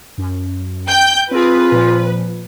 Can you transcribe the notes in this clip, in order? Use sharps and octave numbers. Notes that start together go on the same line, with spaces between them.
F#2
G5 G6
C4 F4 G#4 B4
A#2 F3